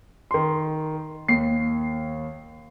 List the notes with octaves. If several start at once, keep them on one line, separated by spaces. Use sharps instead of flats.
D#3 C6
D#2 C7